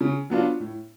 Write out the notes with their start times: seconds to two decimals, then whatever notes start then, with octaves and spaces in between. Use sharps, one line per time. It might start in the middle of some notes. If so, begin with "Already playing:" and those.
0.01 C#3
0.30 F#3 B3 D4 F4
0.60 A2